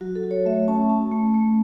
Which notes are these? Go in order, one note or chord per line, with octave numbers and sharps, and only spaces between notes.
F#3 F#4
A4
F#4
C#5
A3 E5
C#4 A5
C#4 A5
A3
A3